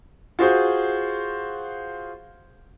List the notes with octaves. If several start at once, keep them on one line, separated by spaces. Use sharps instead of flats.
F4 F#4 G#4 C5